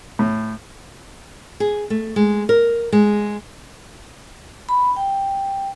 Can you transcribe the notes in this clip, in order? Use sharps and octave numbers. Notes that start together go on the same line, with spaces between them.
A2
G#4
A3
G#3
A#4
G#3
B5
G5